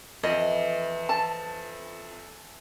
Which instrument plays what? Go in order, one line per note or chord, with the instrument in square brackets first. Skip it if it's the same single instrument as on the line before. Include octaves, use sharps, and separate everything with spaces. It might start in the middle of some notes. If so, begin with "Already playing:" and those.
[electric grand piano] F2 [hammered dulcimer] E3 [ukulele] D#5
[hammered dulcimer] A4 [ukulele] A5